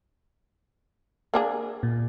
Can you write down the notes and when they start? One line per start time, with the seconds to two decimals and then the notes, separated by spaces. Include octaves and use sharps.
1.34 A#3 D4 G#4
1.83 A#2